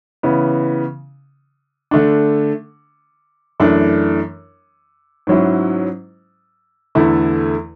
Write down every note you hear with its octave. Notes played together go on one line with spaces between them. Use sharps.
C#3 E3 B3
D3 A3 D4
F#2 E3 A3 D4
G#2 F#3 C#4 E4
E2 D3 A3 E4